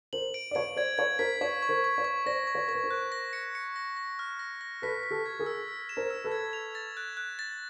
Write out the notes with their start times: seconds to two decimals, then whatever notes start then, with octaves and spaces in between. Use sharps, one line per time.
0.13 A#4 C5 F#7
0.34 D7
0.51 D5
0.55 B4 C#5 D7
0.76 C5 D5 G#6
0.98 B4 C#5 G#6
1.19 A#4 C5 B6
1.41 B4 C#5 C#6
1.63 C#6
1.69 A#4 C5
1.84 C#6
1.98 B4 C#5
2.04 C#6
2.26 C5 D5 A#6
2.47 C#6
2.55 B4 C#5
2.68 A#4 C#6
2.75 B4
2.83 A#4 C5
2.91 F#6
3.12 A#6
3.33 C#7
3.55 C#7
3.76 A#6
3.97 A#6
4.19 F6
4.39 A#6
4.61 A#6
4.82 A4 B4 B6
5.03 B6
5.11 G4 A4
5.26 G#6
5.39 G#4 A#4
5.46 E6
5.68 E6
5.89 E7
5.97 A#4 C5
6.10 E6
6.24 A4 B4
6.32 G#6
6.53 F7
6.75 A6
6.97 F#6
7.17 F#6
7.39 A6